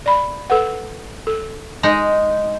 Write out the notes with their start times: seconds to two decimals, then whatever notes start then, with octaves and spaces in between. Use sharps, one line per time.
0.06 D5 B5
0.50 A4 B4 F#5
1.27 A4
1.83 G#3 D#4